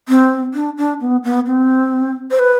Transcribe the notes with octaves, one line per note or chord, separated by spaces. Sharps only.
C4
D4
D4
B3
B3
C4
C5
B4